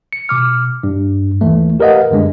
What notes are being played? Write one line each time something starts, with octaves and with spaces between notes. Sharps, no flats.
C#7
B2 D6 F6
G2
D#2 E3 A3
G4 A#4 B4 D#5 F5 F#5
F#2 D3 G#3 D4